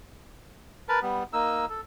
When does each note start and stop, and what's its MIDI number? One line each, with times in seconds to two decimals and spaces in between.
0.89 0.99 70
0.89 0.99 71
0.89 0.99 81
1.02 1.23 55
1.02 1.23 59
1.33 1.65 58
1.33 1.65 63
1.33 1.65 88
1.69 1.81 69